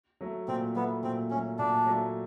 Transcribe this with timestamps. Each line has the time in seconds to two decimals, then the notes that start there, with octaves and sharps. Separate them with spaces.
0.21 F#3 A3
0.48 A#2 C4
0.76 F#3 A3 B3
1.03 A#2 C4
1.30 F#3 A3 C#4
1.59 A#2 D4
1.86 F#3 A3